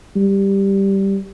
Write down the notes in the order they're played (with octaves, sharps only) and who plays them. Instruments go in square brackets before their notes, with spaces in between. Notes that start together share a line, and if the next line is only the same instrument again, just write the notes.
[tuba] G3